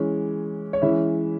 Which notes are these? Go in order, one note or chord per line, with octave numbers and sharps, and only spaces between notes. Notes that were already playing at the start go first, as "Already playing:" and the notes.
Already playing: E3 G#3 C#4
C#5
E3 G#3 C#4 E4 E5